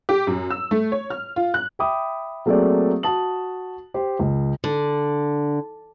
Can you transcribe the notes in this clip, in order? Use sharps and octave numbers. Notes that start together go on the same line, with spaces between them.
G4
F#2
E6
A3
C#5
F6
F4
F#6
E5 G5 B5 D6 D#6
F#3 A3 A#3 C4 G#4 D5
F#4 A5 D#6 F#7
G4 C5
C#2
D3